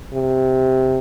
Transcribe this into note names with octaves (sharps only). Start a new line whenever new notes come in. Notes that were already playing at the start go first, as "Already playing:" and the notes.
C3